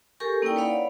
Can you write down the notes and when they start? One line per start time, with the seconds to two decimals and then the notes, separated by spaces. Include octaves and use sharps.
0.20 G4 A4 A#4 G#5 C#6
0.42 A#3 C#4 D#4 E4 D5 G5
0.56 B4 C#5 D5 F5 F#5 B5